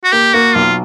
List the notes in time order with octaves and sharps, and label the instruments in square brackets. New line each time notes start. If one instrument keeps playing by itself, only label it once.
[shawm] F#4
[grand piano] A#3 [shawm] G4
[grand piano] A#3 [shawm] F#4
[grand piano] B1 [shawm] F4